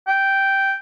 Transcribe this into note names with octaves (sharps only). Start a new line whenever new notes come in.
G5